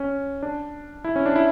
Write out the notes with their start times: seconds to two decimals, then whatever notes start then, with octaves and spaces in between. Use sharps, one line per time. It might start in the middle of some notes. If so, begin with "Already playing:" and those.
Already playing: C#4
0.42 D4
1.04 E4
1.16 C#4
1.26 D4
1.36 E4